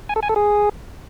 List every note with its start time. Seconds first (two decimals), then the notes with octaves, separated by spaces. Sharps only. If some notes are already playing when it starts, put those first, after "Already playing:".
0.09 G#5
0.16 A4
0.23 G#5
0.29 A4
0.36 G#4